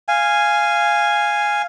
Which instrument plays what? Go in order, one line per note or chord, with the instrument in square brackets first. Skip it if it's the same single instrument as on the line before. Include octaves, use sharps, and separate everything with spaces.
[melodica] F5 G#5